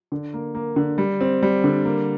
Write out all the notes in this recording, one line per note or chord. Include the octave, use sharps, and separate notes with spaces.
D3
A#3
A#3
D3
G3
C4
G3
D3
A#3